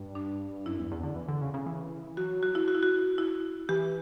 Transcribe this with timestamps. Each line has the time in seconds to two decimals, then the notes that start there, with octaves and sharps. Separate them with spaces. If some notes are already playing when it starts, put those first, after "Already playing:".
Already playing: G2
0.15 D4
0.66 F#2 E4
0.79 E2
0.91 E2
1.03 D3
1.16 E3
1.28 D3
1.41 C#3
1.54 C#3
1.66 E3
2.17 F#3 F#4
2.43 F#4
2.55 E4
2.68 F#4
2.75 E4
2.83 F#4
3.18 E4
3.69 E3 G4